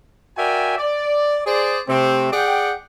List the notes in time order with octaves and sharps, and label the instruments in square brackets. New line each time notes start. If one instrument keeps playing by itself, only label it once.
[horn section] F#4 A#4 D5 E5 G5 G#5
D5
G#4 C5 D5
C3 A3 C4
G#4 D5 F#5 G5